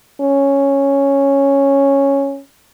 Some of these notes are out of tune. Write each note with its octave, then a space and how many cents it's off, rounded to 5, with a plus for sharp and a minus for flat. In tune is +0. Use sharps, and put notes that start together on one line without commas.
C#4 -5